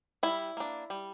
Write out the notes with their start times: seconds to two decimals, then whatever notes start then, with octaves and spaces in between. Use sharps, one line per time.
0.23 G3 E4
0.57 A#3 D4
0.90 G3